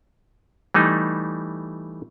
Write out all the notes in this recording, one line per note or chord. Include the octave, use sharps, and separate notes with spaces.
E3 G3 A3 D#4